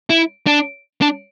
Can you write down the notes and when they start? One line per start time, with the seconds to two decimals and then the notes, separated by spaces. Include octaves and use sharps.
0.10 E4
0.47 D4
1.02 D4